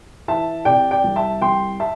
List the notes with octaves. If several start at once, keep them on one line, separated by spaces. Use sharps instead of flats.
E3 E5 A5
C3 D5 G5
D5 G5
C2
E5 A5
C2 G5 C6
E5 A5